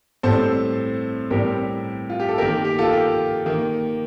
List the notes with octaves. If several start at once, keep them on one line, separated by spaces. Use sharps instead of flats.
A2 G3 C4 A4 C5
A2 G3 C4 G4 A#4
F4
G4
A4
D#3 A#3 G4 A#4
G4
G4
F4 A4
G4
D#3 A#3